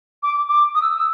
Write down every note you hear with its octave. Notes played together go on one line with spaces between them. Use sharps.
D6
D6
D#6
E6
D#6
E6